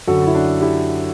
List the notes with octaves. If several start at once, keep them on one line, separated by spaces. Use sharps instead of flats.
F#2 D3 F#3 F#4 A4
E4
D4
E4 G4